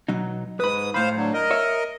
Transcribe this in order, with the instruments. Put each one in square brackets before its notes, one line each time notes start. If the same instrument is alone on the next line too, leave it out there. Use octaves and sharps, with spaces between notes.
[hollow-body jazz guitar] B2 F#3 D#4
[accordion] G#2 D#6 [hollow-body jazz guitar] B4 B5
[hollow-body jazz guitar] A2 B5 [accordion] C5 F5
[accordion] D3 F#3
A#4 D#5
[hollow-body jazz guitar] C#5 E5